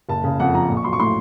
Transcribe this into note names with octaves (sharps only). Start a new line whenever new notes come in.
F#1 A5
C#3
F2 F#5
F3 A#5
A#1
C#6
F#3 C6
C#6
A2 C6